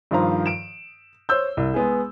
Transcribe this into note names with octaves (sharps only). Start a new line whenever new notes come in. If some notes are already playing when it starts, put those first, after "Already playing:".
G2 D#3 F3 C5 F5 A#5
D7 E7
C5 C#5 E6 G6
C2
G#3 B3 G#4